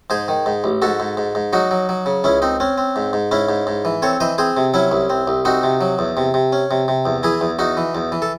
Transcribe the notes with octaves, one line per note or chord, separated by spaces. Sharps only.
G#2 G#4 C5
D#3
G#2
A1
G#2 F#4 A4
G#2
G#2
G#2
F#3 D#4 F#4
F#3
F#3
C#3
C#2 C#4 E4
C4 D#4
C4 C#4
C4
G#2
G#2
G#2 C#4 E4
G#2
G#2
E3
C4 A4 C#5
E3 C5 D#5
C4 G#4 C5
C3
F#3 C#4 E4
C2
C4
C2
C4 D#4 F#4
C3
F#3
E2
C3
C3
C#4
C3
C3
E2
E3 E4 G#4
E2
E2 D#4 F#4
E3
E2
E3
A4